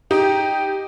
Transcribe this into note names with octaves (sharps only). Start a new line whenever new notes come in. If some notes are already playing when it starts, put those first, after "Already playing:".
D#4 G4 G5